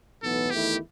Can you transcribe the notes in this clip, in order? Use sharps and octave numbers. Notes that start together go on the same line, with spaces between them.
B1 A2 E3 B3 A4
E2 D#3 A3 E4 G4